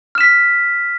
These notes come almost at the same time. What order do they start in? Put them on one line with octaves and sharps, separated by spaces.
F6 E7 B6